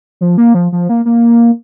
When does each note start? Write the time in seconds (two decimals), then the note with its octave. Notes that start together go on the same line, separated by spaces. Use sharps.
0.21 F3
0.38 A#3
0.54 F3
0.72 F3
0.89 A#3
1.05 A#3